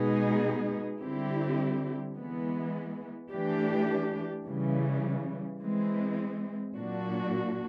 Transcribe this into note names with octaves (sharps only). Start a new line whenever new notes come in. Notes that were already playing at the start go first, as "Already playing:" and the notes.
Already playing: B2 G#3 B3 D#4 G#4
D3 G3 C4 E4 G4
E3 G#3 B3
E3 A3 D4 G4
C#3 E3 G3
E3 G#3 C4
A#2 F#3 A#3 D4 F#4